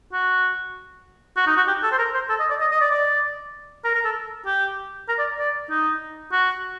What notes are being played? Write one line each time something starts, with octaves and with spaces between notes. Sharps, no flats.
F#4
F#4
D#4
F#4
G4
A4
C5
A#4
C5
A4
D#5
D5
D#5
D#5
D5
D5
A#4
A#4
A4
G4
A#4
D5
D5
D#4
F#4